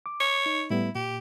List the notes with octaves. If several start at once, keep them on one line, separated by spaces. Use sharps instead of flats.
D6
C#5
D#4
A2 G3 B3 E4
A#2 G4